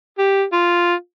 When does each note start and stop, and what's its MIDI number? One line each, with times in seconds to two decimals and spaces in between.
0.19 0.43 67
0.53 0.93 65